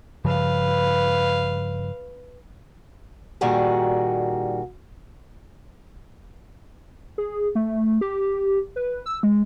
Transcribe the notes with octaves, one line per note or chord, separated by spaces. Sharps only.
G2 C#3 F3 B4 F5
A#2 D#3 G3 F#4 G#4
G#4
A3
G4
B4
E6
G#3